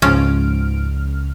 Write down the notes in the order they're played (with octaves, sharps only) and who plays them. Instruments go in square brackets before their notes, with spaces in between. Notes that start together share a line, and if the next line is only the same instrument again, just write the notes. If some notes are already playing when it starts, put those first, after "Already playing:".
[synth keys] C#2 F6 [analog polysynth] G#2 D7 [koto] F3 C#4 A5